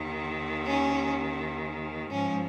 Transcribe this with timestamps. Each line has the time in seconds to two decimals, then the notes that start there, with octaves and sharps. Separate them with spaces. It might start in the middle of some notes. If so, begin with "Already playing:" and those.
Already playing: D#2 D#3
0.67 C#4
2.11 G#2 F3 C#4